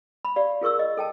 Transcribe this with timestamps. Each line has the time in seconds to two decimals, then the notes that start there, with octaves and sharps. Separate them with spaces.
0.25 B5
0.36 G4 D5 F5
0.61 F4 G#4 A#4 C#6 E6
0.79 D#5
0.97 A4 G5 A5